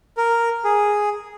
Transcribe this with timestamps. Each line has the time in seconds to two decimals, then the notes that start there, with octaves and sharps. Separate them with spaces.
0.17 A#4
0.64 G#4